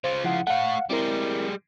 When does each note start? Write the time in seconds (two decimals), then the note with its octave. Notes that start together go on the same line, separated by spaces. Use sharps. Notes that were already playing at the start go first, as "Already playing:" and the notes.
0.04 C#3 F4 C5
0.24 F3 E4 F#5
0.47 A3 C#5 F5 F#5
0.90 G3 G#3 C4 E4 A#4